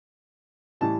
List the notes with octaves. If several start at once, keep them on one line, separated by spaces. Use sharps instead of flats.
A2 E3 G3 A5